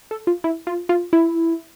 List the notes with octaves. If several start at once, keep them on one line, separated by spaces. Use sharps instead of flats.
A4
F4
E4
F4
F4
E4